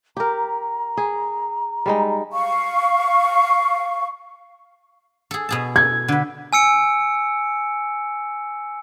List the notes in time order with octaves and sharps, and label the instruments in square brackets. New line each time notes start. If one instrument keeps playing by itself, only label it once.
[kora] G4 A#4 [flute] A#5
[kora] G#4
G3 G#3 D#4
[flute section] F5 C#6
[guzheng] G#4 A4
B2 G#4 A5
[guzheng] A4 [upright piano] G#6
[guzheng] D3 B4
[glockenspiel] G#5 E6 C#7 D7